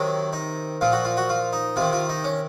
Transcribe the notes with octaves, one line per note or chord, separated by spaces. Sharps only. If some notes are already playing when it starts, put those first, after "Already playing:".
Already playing: C3 D#3 F#3
D#4
A#2 F3 F4
F#4
F4
F#4
F4
D#4
C3 D#3 F4
F4
D#4
C#4